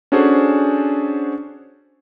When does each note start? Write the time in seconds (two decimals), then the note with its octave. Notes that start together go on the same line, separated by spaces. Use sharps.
0.12 C#4 D4 F#4 G#4 A4 C5